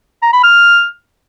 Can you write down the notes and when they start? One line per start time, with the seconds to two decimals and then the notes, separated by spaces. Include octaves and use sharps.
0.23 A#5
0.33 B5
0.43 F6